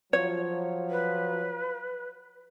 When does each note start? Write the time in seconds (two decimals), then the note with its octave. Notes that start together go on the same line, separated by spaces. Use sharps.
0.13 F3 F#3 C#5
0.90 B4